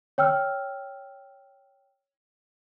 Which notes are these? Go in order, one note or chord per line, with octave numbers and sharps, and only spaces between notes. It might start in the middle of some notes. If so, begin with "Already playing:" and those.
C#5 G5 E6 F6